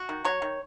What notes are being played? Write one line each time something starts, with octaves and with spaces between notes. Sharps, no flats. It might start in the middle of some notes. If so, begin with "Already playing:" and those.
Already playing: F#4
D#3
F#3 C#5
D#3